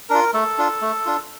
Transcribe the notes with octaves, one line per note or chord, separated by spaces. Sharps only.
D4 F4 A#4
A3 A4
D4 F4
A3
D4 F4